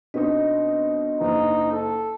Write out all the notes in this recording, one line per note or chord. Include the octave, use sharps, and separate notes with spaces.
B2 C4 D4 D#4 D#5
F#1 D#4
A4